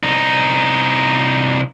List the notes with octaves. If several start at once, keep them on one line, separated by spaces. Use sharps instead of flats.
C2 D#4